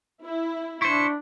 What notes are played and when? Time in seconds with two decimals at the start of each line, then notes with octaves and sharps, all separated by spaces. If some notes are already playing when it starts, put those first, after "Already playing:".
0.23 E4
0.82 D4 E4 C5 C#6